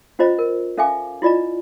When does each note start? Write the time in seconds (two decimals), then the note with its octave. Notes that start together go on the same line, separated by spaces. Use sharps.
0.19 C#4 F4 C5 D#5 A#5
0.39 A#4
0.78 C#4 A4 E5 F5 G#5 D6
1.22 E4 F4 D5 D#5 A#5